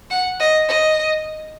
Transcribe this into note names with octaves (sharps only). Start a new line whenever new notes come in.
F#5
D#5
D#5